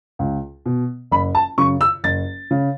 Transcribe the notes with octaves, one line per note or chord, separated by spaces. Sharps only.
C#2
B2
F#1 B5
A5
F#2 C#3 C#6
E6
F#1 A6
C#3